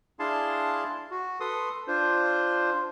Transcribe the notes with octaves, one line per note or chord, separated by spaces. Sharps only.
D4 E4 G#4 F5 A5 C6
F#4
A4 B4 C6 D#6
D4 F4 C5